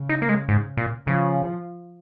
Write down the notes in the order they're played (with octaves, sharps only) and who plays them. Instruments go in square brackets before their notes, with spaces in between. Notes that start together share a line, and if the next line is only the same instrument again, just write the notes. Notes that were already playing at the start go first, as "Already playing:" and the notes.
Already playing: [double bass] C#3
[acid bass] D#4
A#3
G#3
G#2
A#2
[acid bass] C#3 [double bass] F3